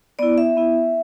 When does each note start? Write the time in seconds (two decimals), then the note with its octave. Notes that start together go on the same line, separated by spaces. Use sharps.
0.19 B3 E4 D5
0.38 E5
0.57 B3 E4